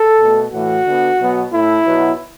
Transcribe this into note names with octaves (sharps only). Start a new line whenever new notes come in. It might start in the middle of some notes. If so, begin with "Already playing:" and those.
Already playing: A4
B2 A3
A2 E3 A3 F#4
D3 B3
B2 F#3 B3
A2 A3 E4
B2 F#3 B3